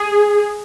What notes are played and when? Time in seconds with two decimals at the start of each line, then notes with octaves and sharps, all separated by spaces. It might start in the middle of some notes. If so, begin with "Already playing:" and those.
Already playing: G#4